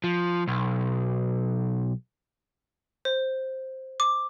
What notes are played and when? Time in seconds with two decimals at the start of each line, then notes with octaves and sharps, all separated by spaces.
0.04 F3
0.48 B1
3.05 C5
4.00 D6